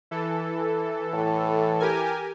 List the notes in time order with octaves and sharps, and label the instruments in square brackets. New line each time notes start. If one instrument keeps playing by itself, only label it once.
[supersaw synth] E3 A4
[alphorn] A2
[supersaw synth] G4 A#4 G#5